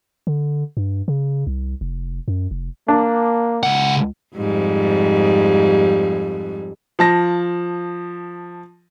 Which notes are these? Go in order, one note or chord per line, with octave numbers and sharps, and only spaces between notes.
D3
G2
C#3
C2
F1
F#2
F1
A#3 D4
C#2 F#5
F2 G#2 G3
F3 A5 A#6